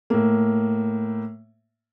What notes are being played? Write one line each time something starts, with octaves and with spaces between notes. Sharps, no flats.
A2 A#3